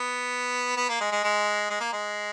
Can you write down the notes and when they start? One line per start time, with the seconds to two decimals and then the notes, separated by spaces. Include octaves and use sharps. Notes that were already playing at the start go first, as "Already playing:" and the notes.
Already playing: B3
0.77 B3
0.89 A#3
1.00 G#3
1.12 G#3
1.23 G#3
1.70 G#3
1.80 A#3
1.93 G#3